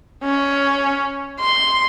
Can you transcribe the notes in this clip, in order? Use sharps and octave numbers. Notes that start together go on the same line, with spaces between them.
C#4
C6